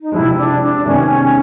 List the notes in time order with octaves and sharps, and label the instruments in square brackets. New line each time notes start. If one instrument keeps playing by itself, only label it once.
[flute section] D#4
[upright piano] C3 F3 G#3 [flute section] E4
[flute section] D4
D4
[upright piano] C3 D#3 G#3 B3 [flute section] C#4